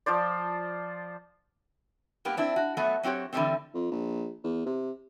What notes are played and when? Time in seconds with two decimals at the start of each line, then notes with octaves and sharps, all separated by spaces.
0.06 F3 F4 C5 D5
2.25 G2 A#3 B3 G4
2.37 C4 D4 E4
2.56 F#4
2.77 F#3 A3 B3 F#4
3.03 F#3 C4 F#4 G4 C#5
3.33 D3 E3 F3 G3 A3 C4
3.74 F2
3.91 A#1
4.44 E2
4.66 C3